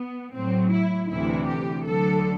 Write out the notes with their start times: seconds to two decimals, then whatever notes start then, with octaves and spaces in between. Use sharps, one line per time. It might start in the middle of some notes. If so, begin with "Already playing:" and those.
Already playing: B3
0.34 A2 F#3 C4
0.72 E4
1.10 D2 C3 E3 E4
1.47 G4
1.86 D2 D3 F#3 A4